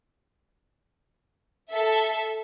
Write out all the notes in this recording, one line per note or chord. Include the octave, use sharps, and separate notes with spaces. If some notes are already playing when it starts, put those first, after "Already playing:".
A4 E5